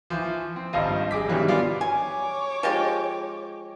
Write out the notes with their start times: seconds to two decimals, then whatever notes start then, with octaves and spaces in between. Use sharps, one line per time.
0.10 E3 F3
0.56 C4
0.73 G#1 G2 F3 G3 D#5 F5
1.11 G3 G#4 D6 B6
1.28 G2 B2 D#3 E3 F#3 G3
1.48 B3 F4 F#4 D5 F5
1.81 C#5 G#5 D6
2.63 F3 G#3 G4